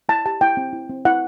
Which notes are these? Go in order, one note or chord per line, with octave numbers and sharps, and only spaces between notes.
E4 A5
G4 A5
E4 G5
C4
E4
C4
E4 F#5